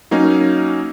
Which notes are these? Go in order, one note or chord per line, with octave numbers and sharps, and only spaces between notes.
F#3 A#3 C#4 D#4